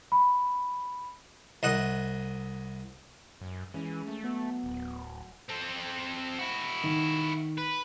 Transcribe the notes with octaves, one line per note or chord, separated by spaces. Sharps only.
B5
C2 D#5 F#5 D#6
F#2
E3 G#3 C#4
A3
F#3 B3
D1
C4 A4
E4 F#4
D#3
B4